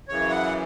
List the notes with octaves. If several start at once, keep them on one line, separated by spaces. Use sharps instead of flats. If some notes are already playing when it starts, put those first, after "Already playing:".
F#2 C#3 E3 C#5
F#5